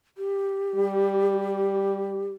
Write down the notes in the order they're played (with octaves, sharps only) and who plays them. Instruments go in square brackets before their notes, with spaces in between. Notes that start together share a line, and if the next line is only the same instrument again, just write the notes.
[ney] G4
[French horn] G3